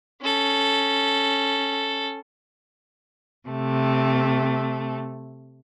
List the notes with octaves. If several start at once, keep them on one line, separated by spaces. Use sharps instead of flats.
C#4 A4
C3 A3